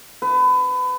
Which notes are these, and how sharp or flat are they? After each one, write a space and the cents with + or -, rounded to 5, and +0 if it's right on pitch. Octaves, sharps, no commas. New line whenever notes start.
B4 +30